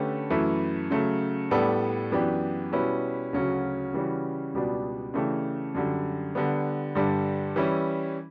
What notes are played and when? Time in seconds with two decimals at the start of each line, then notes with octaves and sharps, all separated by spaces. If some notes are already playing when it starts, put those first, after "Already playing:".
Already playing: D3 A3 C#4 G4 B4
0.30 F#2 E3 A3 E4 B4
0.91 C#3 F#3 A3
1.51 A2 G3 B3 D4 A4
2.12 F#2 E3 B3 D4 G4
2.72 B2 G3 C#4 E4 B4
3.33 D2 C#3 F#3 C#4 F#4
3.93 C#3 E3 G3 C#4 F#4
4.53 C#2 B2 G3 B3 D4
5.14 C#3 E3 A3 D4 G4
5.74 F#2 D3 G3
6.35 D3 G3 B3 D4
6.95 G2 D3 G3 D4
7.56 E3 G3 C#4 E4